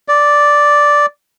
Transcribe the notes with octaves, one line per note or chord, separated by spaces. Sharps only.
D5